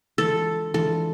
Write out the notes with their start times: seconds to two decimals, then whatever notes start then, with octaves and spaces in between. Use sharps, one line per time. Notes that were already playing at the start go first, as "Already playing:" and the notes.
0.18 E3 G#3 D4 F4 A4
0.74 E3 G#3 D4 F4 A4